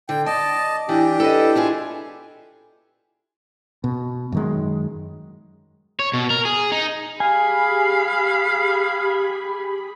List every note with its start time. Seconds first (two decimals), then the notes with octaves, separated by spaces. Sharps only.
0.09 D3 G5
0.26 D5 D#5 A5
0.89 E3 D4 G4
1.20 A4 B4 D#5
1.55 E4 F4 G#4
3.84 B2
4.32 F#2 D#3 G#3
5.99 C#5
6.13 B2
6.30 A#4
6.45 G#4
6.72 D#4
7.20 G4 G#4 F5 G#5 B5